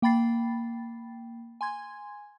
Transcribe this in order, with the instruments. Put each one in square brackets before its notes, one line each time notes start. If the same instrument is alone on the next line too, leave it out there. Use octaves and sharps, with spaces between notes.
[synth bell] A#3 G5 B5 A6 C7
G#5 C6 G#6